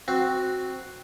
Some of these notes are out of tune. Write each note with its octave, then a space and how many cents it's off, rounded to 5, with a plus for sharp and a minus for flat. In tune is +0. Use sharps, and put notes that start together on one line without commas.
C4 +0 F#4 +0